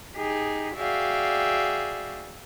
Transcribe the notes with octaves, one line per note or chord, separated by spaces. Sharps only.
D#4 G4 G#4
F#4 G#4 D5 E5 F5 G5